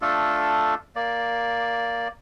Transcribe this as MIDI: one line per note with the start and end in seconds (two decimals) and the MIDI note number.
0.02 0.75 57
0.02 0.75 62
0.02 0.75 65
0.02 0.75 69
0.96 2.08 58
0.96 2.08 74